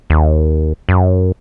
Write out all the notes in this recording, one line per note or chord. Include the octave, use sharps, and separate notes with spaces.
D#2
F#2